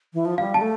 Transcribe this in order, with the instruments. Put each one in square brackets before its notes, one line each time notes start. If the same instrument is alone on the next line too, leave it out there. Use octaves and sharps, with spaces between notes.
[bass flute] E3
F3
[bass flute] G3 [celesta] F5
[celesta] A5
[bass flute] G3
A3